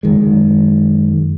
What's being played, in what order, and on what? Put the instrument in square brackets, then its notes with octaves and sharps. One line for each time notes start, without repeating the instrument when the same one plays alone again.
[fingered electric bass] F#2 D#3 G#3